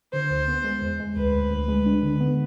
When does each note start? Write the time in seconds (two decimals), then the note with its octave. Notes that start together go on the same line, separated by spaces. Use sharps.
0.13 D3 C5
0.30 D2
0.48 B3
0.64 G#3
0.82 E2
1.00 G#3
1.17 D2 B4
1.34 D2
1.51 D2
1.68 G#3
1.86 D4
2.03 D3
2.20 B3